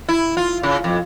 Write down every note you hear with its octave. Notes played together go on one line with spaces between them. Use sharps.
E4
F4
C#3
F2